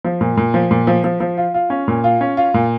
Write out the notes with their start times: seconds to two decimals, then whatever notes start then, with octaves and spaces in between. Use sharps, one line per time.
0.05 F3
0.21 A#2
0.37 A#2
0.54 F3
0.71 A#2
0.87 F3
1.04 F3
1.20 F3
1.37 F4
1.54 F4
1.70 C#4
1.88 A#2
2.04 F4
2.21 C#4
2.37 F4
2.54 A#2